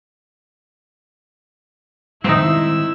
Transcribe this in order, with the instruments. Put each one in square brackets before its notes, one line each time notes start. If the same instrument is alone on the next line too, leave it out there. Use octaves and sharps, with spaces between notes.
[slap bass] D#3 G3 G#3 [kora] C4 D#4 [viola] E4 [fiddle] E6